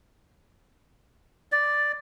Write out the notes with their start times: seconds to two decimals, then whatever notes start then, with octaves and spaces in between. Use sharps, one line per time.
1.52 D5